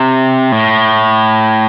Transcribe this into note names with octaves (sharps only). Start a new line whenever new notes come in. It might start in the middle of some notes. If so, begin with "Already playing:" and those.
Already playing: C3
A2